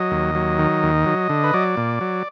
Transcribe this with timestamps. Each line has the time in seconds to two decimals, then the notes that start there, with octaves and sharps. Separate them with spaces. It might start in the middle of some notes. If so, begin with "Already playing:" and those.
Already playing: F#3 D#5
0.11 D#2
0.35 F#3
0.58 D#3
0.83 D#2
1.06 F#3
1.29 D3
1.44 B4
1.54 F#3 D5
1.77 A#2
2.01 F#3